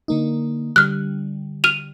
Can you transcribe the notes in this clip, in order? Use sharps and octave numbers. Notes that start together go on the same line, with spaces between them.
D3 A#3 D#4
D3 G3 F6 F#6
F6 D#7 F7